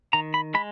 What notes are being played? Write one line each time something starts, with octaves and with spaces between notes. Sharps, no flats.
D#3 A#5
B5
G#3 B5